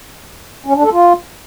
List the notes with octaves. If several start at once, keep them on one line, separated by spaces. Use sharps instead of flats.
C#4
D4
A4
F4